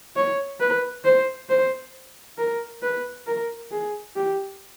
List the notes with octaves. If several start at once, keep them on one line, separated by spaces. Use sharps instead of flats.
C#5
B4
C5
C5
A#4
B4
A#4
G#4
G4